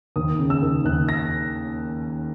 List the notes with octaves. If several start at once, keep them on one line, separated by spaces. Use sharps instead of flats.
D#2 D#6
C#3
E6
D#2
D#2 F#6
A#6